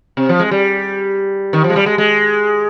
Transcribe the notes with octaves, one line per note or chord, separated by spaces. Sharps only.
C3
F3
G#3
G3
D#3
F3
G#3
G3
G#3
G#3